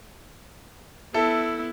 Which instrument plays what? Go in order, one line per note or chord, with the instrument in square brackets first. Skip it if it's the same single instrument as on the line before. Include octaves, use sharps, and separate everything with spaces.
[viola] B3 E4 [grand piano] A4 E5